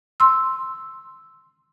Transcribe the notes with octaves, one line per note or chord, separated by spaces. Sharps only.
C6 E6